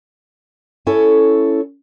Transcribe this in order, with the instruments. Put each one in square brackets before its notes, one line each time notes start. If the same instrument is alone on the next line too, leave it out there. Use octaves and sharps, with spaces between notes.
[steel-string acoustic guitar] C#4 E4 A4 C#5